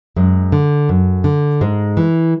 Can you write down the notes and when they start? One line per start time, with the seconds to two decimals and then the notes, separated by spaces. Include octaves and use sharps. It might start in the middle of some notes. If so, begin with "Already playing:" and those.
0.16 F#2 G#3
0.52 D3
0.89 F#2
1.24 D3
1.61 G#2 G#3
1.97 E3